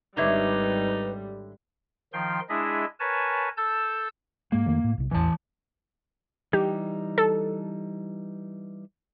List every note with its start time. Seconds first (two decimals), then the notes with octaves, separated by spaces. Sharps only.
0.17 G#1 D3 G3 D#4 B4 C#5 E5
2.13 D#3 F3 G5 C6
2.49 G#3 D4 E4 G#4 D#5 E5
3.00 A#4 B4 C#5 G#5 A5
3.57 A4 A5 E6 G6
4.52 G#2 G#3 A#3
4.66 F2 D#3 A3
4.84 A2
4.98 B1 C3
5.11 A1 E2 E3 A5
6.53 E3 G3 D#4 G4
7.18 A4